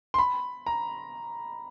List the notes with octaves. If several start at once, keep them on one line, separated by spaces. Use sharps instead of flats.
C6
B5
A#5